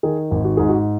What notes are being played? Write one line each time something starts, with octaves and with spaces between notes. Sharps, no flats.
D#3 G#4
G#1
F#4
G#2 G#4
F#4